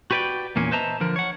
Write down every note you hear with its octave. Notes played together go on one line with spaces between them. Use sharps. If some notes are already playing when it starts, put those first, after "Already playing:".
F#4 G4 B4 C#5 D5 G5
E2 A#2 A#3 C#4
B4 C5 D#5 E5 A5 A#5
D3 F3 A#4
C#5 F#5